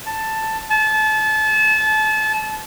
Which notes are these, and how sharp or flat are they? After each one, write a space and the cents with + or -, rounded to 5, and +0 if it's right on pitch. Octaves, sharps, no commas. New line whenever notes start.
A5 +5
A5 -30